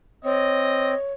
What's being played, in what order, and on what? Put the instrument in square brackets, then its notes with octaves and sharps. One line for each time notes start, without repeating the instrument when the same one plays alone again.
[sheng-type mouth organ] C4 [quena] C#5 [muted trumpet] D#5